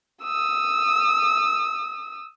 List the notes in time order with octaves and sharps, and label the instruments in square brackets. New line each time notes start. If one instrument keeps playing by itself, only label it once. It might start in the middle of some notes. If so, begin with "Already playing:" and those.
[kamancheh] D#6 E6